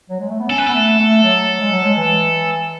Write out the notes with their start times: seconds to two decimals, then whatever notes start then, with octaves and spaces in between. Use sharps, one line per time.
0.10 F#3
0.20 G#3
0.30 A3
0.40 B3
0.50 C#4 A4
0.58 B4
0.67 B3 A4
0.74 A3
0.99 A3
1.23 F#3
1.61 G#3
1.72 F#3
1.84 G#3
1.97 E3